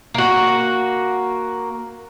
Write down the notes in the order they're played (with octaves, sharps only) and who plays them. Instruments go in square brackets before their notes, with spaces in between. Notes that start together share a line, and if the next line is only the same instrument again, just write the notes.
[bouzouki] A#3 F#4